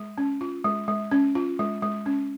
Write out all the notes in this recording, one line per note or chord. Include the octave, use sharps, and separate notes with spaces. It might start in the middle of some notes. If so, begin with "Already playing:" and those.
Already playing: G#3
C#4
F4
G#3
G#3
C#4
F4
G#3
G#3
C#4